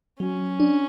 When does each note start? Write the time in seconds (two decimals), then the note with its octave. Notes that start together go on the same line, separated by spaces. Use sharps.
0.20 F#3 C#4
0.60 D4